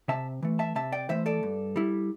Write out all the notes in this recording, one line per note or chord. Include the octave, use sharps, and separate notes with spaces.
C3 E5 A5
E3 A3
E5 A5
C3 E5 A5
D5 G5
E3 A3 C5 E5
A4 D5
G2
G3 E4